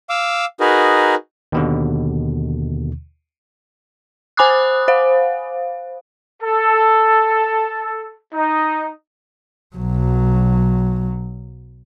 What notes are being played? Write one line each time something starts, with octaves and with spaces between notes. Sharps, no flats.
F5 D6 E6
D#4 F#4 G#4 A#4 B4
D#2 B2 D3
C5 G#5 B5 D6 D#6 F#6
C5 F5
A4
D#4
B1 F#3